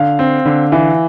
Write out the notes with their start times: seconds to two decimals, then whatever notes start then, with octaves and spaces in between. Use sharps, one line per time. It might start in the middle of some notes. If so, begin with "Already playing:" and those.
Already playing: D3 F5
0.19 C4
0.45 D3
0.72 E3 E5